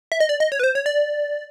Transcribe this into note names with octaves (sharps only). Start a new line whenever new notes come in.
E5
D#5
D5
D#5
C#5
B4
C5
C#5
D5